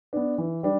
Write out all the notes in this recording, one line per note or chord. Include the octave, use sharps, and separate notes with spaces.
B3 D4
E3
G3 D4